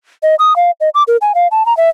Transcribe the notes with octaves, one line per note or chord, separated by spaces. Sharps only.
D#5
D#6
F5
D#5
D6
A#4
G#5
F5
A5
A#5
E5